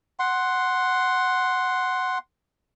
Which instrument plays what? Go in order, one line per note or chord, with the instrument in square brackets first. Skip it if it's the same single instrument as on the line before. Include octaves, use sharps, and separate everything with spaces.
[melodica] F#5 C6